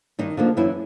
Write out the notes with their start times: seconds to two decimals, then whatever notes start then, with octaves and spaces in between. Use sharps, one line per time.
0.19 G2 D#3 D#4
0.37 D3 F3 A#3
0.57 F#2 E3 E4